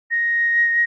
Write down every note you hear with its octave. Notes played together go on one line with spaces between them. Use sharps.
A#6